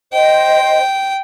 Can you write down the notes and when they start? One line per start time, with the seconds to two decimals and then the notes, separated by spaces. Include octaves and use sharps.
0.13 C5 D#5 G5